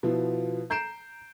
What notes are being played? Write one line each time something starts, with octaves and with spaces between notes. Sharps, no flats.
B2 F3 B3 E4 F4
A#5 G6 C7 D7 E7